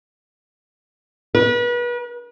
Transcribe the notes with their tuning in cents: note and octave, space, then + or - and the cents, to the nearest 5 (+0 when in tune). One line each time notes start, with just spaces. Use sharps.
B4 -35